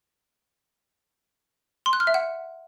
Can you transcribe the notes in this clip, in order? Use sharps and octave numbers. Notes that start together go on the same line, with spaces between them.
C6
F#6
F6
E5
F#5